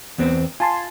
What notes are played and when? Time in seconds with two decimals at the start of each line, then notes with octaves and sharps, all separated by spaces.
0.18 E2 B3 C4
0.60 F4 G#5 A5 C6